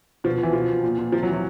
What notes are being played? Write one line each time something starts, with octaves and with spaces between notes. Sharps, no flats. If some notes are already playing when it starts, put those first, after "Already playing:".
B2 F3
B2
E3
B2 F3
B2
A#2
A#2
C3 F3
F#3
E3
F#3